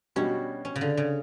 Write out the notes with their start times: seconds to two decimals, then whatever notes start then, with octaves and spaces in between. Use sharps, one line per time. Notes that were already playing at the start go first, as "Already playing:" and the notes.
0.16 B2 G3 C#4 D4 F#4
0.65 C#4
0.76 C#3
0.81 D3
0.97 C#3